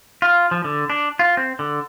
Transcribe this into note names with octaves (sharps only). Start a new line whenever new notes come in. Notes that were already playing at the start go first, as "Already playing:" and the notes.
F4
F3
D3
D4
F4
C4
D3